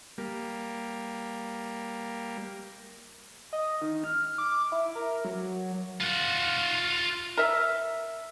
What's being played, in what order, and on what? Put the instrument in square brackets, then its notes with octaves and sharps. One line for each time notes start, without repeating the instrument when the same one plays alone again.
[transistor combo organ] G3 A#3
[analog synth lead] D#5
D#3
F6
D6
E4
A#4
F#3
[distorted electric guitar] F4 F#5
[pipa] A#4 E5